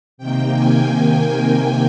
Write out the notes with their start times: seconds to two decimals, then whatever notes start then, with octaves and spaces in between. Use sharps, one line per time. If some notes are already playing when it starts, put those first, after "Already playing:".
0.18 C3 D#3 A#3 G5
0.54 G#5
0.90 G#5